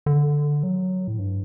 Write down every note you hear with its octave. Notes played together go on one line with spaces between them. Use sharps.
D3
F#3
A2
G2